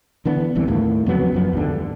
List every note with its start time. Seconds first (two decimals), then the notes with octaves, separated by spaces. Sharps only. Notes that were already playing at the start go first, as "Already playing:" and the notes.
0.25 D3 E3 B3 D4
0.55 E1 C2 C3 E3
0.67 D#2 A2 D3 A#3
1.06 F2 C#3 F#3 B3
1.32 F#2 F3 B3
1.53 D#2 G#2 D3